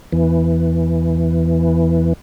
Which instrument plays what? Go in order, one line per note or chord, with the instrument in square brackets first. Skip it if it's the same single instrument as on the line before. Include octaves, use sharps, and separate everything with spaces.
[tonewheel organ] E2 E3